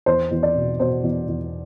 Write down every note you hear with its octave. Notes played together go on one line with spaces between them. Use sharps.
E2 C5
E2
D5
B2
B2 C5
E2
E2